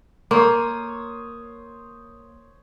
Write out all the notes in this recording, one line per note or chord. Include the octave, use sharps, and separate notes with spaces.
A#3 C5 C#5 D#6